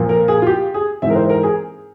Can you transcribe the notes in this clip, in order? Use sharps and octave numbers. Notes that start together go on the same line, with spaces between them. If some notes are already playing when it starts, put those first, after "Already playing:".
Already playing: A#2 F3 A#3
A#4
G#4
F4
G4
G#4
G#2 E3 G#3 C4 E5
A#4
C5
A#4
G#4